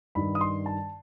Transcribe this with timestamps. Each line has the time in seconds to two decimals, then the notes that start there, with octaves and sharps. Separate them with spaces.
0.15 G2 D#3 B5
0.35 D#6
0.41 C6
0.66 A5